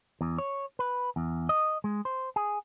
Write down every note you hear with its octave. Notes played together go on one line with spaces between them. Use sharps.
E2
C#5
B4
E2
D#5
G#3
C5
G#4